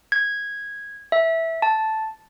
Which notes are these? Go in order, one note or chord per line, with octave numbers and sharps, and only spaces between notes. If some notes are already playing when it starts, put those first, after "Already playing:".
G#6
E5
A5